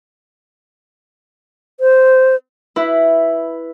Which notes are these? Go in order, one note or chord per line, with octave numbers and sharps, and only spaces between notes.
C5
E4 B4